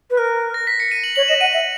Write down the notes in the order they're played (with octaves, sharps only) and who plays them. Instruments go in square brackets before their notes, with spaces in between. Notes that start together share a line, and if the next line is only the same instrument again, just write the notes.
[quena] B4
[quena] A#4 [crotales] F#6
[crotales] A#6
B6
C#7
D#7
F#7
[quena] C#5 [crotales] F#7
[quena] D#5 [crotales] E7
[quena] F#5 [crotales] D#7
[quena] E5 [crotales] D#7